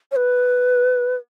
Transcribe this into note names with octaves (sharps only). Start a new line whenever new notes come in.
C#5
B4